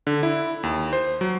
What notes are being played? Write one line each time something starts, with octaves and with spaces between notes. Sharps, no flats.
D3
E4
D#2
C5
F#3